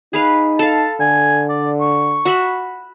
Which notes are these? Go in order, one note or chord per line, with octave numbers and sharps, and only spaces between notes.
D#4 G#4 B4 F5
A4 F5 A5
D3 G#5
D5
C#6
F#4 E5 B5